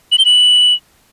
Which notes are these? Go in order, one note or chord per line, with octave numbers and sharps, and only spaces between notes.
F#7
G7
F#7